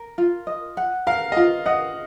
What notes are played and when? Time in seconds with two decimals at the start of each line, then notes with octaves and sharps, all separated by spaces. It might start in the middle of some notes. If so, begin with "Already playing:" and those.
Already playing: A#4
0.18 F4
0.47 D#5
0.77 F#5
1.07 A#4 F5
1.32 D#5
1.37 F4 F5
1.66 D#5 F#5